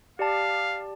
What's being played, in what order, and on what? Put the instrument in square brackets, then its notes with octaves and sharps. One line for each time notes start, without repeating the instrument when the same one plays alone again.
[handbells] G4 D5 A5 [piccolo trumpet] F5